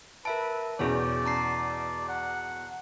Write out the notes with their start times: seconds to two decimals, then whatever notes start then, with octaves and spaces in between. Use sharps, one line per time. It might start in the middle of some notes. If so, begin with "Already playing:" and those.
0.25 A#4 B4 E5 A5 D7
0.79 E2 B2 E3 C#4 G#4 C#5 D5
1.26 A5 A#5 C7
2.09 F#5